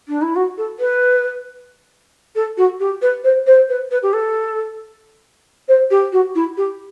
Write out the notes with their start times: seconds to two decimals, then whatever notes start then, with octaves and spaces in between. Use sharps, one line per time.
0.08 D4
0.22 E4
0.36 F#4
0.58 A4
0.80 B4
2.35 A4
2.57 F#4
2.80 G4
3.02 B4
3.24 C5
3.47 C5
3.69 B4
3.91 B4
4.03 G4
4.13 A4
5.68 C5
5.91 G4
6.12 F#4
6.35 E4
6.57 G4